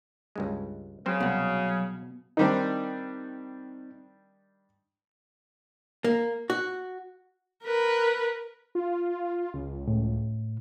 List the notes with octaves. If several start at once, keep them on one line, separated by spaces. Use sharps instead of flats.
C#2 G2 G#3
C#3 F#3 C4 C5
C2 B2 F#5
D#3 G3 C4 D4 D#4
A#3
F#4
A#4 B4
F4
C#2
A2